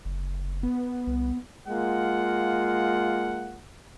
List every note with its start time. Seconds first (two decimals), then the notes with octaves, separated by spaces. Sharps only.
0.05 F#1
0.63 B3
1.07 C2
1.67 G#3 A#3 F4 F#5